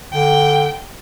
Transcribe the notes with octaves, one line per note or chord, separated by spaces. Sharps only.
D3 G5